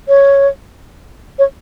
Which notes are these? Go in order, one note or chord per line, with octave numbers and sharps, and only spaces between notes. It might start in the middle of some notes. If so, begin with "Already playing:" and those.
C#5
C#5